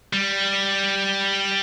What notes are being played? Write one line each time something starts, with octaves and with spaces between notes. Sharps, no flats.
G3